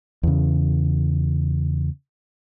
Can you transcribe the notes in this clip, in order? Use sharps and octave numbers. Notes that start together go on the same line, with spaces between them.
E2 C#3